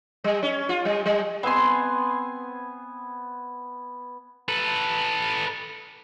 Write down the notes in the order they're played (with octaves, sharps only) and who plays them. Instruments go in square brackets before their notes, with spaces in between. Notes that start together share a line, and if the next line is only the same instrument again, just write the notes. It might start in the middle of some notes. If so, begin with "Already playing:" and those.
[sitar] G3
C#4
F4
G3
G3
[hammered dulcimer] B3 G#5 [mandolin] C4 C6
[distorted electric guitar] A4 B4